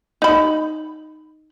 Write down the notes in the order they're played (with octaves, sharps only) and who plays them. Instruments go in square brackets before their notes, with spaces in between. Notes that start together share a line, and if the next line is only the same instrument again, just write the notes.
[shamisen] D#4 B5